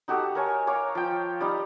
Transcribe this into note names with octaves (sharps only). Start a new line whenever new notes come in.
D#4 F#4 G4 A4
A#4 C#5 G#5
C#5 F5 A#5 D6
F3 G5
G3 D#4 A#5